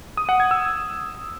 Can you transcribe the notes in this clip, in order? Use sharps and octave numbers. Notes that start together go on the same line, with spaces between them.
D#6
F#5
G#6
E6